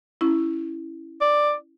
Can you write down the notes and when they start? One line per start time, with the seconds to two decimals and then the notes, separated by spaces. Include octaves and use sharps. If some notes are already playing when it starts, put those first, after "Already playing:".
0.21 C#4 E4
1.21 D5